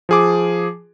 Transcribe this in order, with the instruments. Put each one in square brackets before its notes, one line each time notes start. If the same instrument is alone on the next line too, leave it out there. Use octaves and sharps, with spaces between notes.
[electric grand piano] F3 G#4 D6